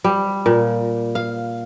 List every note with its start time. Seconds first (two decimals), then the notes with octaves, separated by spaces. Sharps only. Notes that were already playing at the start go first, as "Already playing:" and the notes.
0.04 G3
0.46 A#2
1.15 F5